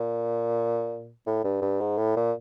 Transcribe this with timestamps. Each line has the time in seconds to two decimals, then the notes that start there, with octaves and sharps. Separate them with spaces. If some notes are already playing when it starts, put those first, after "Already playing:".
Already playing: A#2
1.26 A2
1.44 G2
1.62 G2
1.80 G#2
1.98 A2
2.16 A#2